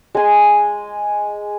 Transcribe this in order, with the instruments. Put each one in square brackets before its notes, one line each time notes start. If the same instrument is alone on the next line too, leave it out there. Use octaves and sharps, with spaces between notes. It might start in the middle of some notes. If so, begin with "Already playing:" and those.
[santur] G#3 G#5